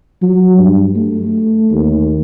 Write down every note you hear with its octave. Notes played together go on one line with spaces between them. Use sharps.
F#3
G2
A3
D#2